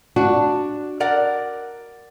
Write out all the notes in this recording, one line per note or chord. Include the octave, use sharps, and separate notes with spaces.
D4 F#4
A#4 D5 F#5